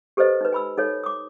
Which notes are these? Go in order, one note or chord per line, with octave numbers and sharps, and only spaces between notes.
G4 A4 B4 C5 D#5
D#4 B4
G#5 B5 E6
D#4 A4 C#5
D6 D#6